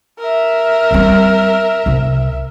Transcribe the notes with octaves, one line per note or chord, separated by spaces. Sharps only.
A#4 E5
G3 C4
C2 C4